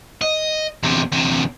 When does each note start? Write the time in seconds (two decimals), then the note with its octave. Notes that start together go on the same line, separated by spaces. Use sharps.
0.22 D#5
0.83 E2 C3
1.12 E2 C3